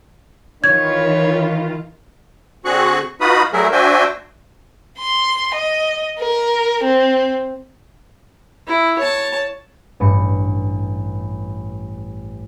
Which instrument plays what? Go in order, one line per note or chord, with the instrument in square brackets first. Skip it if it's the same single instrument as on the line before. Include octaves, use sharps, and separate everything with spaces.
[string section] D#3 E3 F4 [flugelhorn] C#5 [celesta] G#6
[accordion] D3 C4 F#4 G#4 C#6 F#6
D#4 F4 F#4 B4 B5 D#6
F#3 G3 A3 G#4 A#4 E5
D4 F#4 C5 E5 G5 G#5
[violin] C6
D#5
A#4
C4
[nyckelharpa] E4
C#5 A5
[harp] A1 G2 C#7